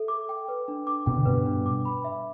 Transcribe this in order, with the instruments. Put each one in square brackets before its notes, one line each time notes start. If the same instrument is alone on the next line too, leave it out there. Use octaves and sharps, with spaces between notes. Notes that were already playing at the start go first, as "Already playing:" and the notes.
Already playing: [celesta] A4 E5
D6
G5
B4
D4
D6
[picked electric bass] B2 [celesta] G5
[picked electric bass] D3
[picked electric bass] G2 B2 [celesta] B4
[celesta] D4
D6
B5
E5